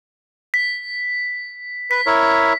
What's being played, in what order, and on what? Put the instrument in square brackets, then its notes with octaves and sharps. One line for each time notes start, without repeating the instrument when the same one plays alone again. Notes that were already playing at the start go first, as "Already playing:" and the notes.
[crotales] B6
[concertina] B4 [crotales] B6
[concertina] E4 A#4 C#5